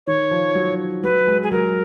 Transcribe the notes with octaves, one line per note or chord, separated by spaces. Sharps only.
D#3 C#5
F3
F#3
F#3 B4
G#3
G#4
F#3 A#4